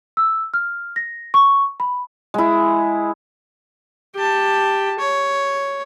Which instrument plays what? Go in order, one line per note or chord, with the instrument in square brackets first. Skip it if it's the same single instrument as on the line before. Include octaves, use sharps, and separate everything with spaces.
[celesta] E6
F6
A#6
C#6
B5
[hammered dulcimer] G#3 E4
[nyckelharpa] G4 A5
C#5